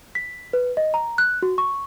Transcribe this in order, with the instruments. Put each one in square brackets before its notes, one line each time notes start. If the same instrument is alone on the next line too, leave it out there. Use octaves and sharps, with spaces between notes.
[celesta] B6
B4
D#5
A#5
F#6
F#4
C#6